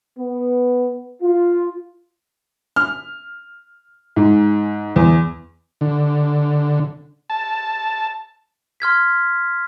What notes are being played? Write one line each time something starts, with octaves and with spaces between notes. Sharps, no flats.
B3
F4
F6
G#2
E2
D3
A5
C6 F6 G#6 B6